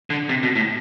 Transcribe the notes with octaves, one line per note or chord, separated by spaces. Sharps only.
D3
C3
B2
A2